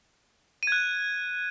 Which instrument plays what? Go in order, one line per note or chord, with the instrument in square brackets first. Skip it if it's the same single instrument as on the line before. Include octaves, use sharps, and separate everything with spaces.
[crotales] D#7
G#6
F#6